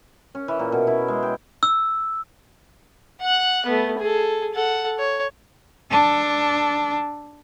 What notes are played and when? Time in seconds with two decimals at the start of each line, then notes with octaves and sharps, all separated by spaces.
0.35 C#4
0.48 E3
0.59 A#2
0.72 B2
0.87 E4
1.08 G#3
1.23 G5
1.63 E6
3.21 F#5 F#6
3.66 A3 B3
3.98 G#4 A4
4.54 A4 F#5
4.99 C#5
5.91 D4 A4